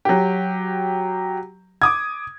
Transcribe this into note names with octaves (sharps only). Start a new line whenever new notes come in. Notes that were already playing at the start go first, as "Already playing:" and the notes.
F#3 G4
D6 D#6 G#6